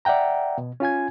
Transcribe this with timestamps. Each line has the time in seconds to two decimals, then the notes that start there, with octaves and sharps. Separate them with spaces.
0.05 D5 E5 F#5 G5 A#5
0.58 B2
0.80 C#4 F4 G#5 G#6